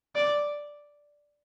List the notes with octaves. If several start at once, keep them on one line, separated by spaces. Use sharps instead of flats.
D5